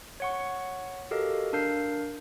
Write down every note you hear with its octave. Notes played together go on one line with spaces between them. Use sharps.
C#5 F#5 C#6
F#4 G4 A4 A#4 D#5 F5
D4 A#4 F5 G6 C7